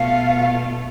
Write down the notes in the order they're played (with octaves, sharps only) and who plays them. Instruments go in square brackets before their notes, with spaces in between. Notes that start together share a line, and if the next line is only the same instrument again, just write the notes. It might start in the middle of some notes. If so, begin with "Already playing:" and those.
Already playing: [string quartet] B2 A3 F4 [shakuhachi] F5